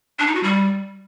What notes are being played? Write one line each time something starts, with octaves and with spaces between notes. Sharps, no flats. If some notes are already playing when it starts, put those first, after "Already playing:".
D4
D#4
F#4
G3